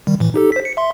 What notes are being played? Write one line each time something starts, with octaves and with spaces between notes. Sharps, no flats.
D#3 G3
A2 E3
D#4 G4 A4
C5 B6
C#7
E5 C6